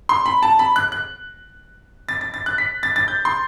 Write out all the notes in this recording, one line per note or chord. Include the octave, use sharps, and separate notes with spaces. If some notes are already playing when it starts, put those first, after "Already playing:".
C6
B5
A5
B5
F#6
F#6
A6
A6
A6
F#6
B6
A6
A6
G6
C6